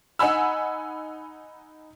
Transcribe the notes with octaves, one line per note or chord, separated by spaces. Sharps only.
D#4 F#5 G#5 B5 E6